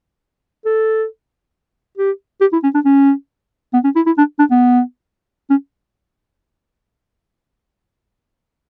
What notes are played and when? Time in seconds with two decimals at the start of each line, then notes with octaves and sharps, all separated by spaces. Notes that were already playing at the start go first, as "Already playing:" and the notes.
0.65 A4
1.98 G4
2.41 G4
2.53 E4
2.63 C#4
2.74 D4
2.85 C#4
3.74 B3
3.84 C#4
3.96 E4
4.06 E4
4.18 D4
4.39 D4
4.51 B3
5.50 C#4